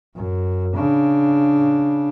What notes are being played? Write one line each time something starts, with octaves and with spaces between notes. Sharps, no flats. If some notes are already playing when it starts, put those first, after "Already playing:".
F#2
C#3 D4